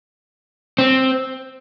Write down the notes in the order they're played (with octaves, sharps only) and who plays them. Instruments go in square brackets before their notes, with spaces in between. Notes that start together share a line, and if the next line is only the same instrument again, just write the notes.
[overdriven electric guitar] C4